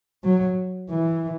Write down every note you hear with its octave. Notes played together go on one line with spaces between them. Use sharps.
F#3
E3